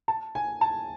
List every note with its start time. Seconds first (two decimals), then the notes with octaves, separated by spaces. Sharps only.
0.08 A5
0.35 G#5
0.61 A5